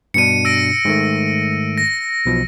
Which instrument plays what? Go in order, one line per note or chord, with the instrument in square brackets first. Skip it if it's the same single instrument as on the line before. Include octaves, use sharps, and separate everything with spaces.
[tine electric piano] G2 B2 D4 [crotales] C#7 D#7
[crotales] E6 A#6 D7
[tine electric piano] G#2 D#3 A3
[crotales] A#6
[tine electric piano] B1 B2 F3